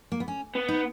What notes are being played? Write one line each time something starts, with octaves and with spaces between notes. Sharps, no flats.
A#3
B3
C#4
B3
D#4